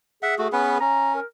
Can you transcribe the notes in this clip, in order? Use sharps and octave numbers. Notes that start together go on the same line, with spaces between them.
G#4 E5 F#5
A3 F#4
B3 C#4 B4
C#4 A#5
A#4